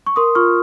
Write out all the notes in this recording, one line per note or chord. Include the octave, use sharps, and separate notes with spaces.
C#6
A#4 C6 D#6
F4 C#6 F6